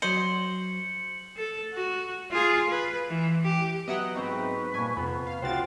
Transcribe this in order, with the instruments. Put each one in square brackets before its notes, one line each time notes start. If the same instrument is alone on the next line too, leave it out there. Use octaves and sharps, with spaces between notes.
[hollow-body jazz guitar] F#3 D#5 [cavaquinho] C5 [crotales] C#7 F#7
[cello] A4
F#4
F4 G#4
B4
E3
G4
[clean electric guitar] F#3 B3 [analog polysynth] D#5 E5 F#5
[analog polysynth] G#2 C4 D#4 [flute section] B4 C#6
[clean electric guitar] G2 A#2 [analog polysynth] G#5
[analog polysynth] F2 [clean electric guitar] C3 B3 B5
[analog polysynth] F5
[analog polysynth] C#2 A6 [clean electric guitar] F4 F#4 C5 [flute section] G5